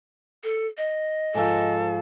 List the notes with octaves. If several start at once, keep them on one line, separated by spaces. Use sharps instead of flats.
A4
D#5
G#2 F3 A4